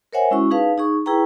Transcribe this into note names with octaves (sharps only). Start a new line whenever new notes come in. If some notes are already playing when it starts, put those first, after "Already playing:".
A#4 C5 C#5 E5 F#5 G#5
G#3 C#4 E4 F#4 C#6
D#4 G#4 B4 F5 A5
D#4 G#4 C#6
E4 G#4 B4 G5 A#5 C#6